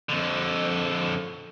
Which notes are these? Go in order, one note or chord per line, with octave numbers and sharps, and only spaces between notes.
F2 D3